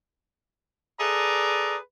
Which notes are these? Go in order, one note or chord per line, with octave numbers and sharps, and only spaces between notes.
G#4 A4 B4 D5 A#5